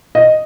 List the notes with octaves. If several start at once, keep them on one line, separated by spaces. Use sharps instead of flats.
D#5